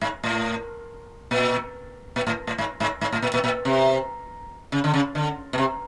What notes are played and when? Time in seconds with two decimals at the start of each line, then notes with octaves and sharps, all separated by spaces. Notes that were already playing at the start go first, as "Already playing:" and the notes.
0.01 G#2
0.23 A2
1.31 A#2
2.16 A#2
2.27 A2
2.47 A2
2.58 G#2
2.80 G#2
3.01 G#2
3.12 A2
3.22 A#2
3.34 A#2
3.44 A#2
3.65 C3
4.72 C#3
4.84 D3
4.94 C#3
5.15 D3
5.53 B2
5.58 C3